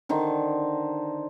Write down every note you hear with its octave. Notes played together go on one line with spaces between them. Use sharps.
D3 D#3 C5